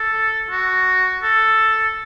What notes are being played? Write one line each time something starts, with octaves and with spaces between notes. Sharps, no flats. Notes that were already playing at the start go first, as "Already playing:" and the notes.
Already playing: A4
F#4
A4